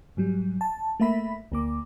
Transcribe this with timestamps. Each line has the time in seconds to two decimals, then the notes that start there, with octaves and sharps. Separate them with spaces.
0.17 G#2 F#3 G3
0.61 A5
1.00 A3 A#3 E5 B5 B6
1.52 D2 A#3 D6